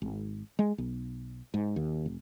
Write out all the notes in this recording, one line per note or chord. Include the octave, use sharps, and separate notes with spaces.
G#1
G#3
B1
G#2
D#2
F1